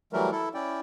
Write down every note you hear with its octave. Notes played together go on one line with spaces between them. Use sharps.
E3 F#3 G3 A3 A#4
E4 A4
C#4 E4 D5 G5